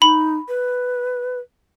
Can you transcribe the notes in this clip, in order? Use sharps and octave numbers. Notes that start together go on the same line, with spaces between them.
D#4 B5
B4